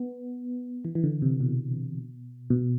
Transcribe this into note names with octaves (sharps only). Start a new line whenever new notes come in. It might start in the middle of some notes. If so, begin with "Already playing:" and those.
Already playing: B3
E3
E3
D3
C3
B2
B2